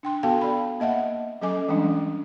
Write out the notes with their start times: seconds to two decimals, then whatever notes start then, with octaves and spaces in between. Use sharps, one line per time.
0.03 D4 G5 C6
0.23 B3 F#4 A4 F5 G5
0.41 D5 B5
0.80 A#3 D#5 E5 F#5
1.42 F#3 C#4 A4 D#5 G#5 D6
1.69 E3 G3 G#3 C#4 D4